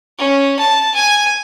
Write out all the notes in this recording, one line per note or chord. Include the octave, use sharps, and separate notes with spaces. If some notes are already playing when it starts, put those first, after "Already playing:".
C#4
A5
G#5